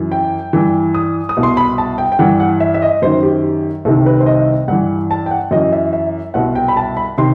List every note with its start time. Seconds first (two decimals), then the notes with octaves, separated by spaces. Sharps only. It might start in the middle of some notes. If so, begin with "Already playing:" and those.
Already playing: F#2 E3
0.12 G5
0.53 G2 E3
0.94 D#6
1.29 D#6
1.37 C2 B2
1.43 C6
1.57 B5
1.78 A5
1.98 G5
2.12 G5
2.19 G2 E3 F#5
2.40 F#5
2.60 E5
2.74 E5
2.82 D#5
3.02 F#2 D#3 C5
3.23 G4
3.85 C2 C3 D#3 A4
4.06 B4
4.20 C5
4.26 D#5
4.68 G2 E3 F#5
5.11 A5
5.26 G5
5.31 F#5
5.51 F#2 E3 D#5
5.72 E5
5.93 E5
6.34 C2 B2 F#5
6.55 G5
6.68 B5
6.77 A5
6.97 B5
7.18 C3 D#3 C6